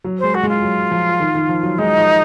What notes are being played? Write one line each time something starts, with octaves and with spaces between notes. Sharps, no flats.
F#3
G#3 C5
F#4
G#3 F4
F#3
F3
D#3
D#3
F3
F#3
G#3 D#4
F3